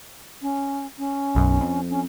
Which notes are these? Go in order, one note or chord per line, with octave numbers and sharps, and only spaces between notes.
C#4
C#4
B1 F#2
F2
C#4